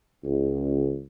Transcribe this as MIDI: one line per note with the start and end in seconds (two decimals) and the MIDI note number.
0.24 1.01 37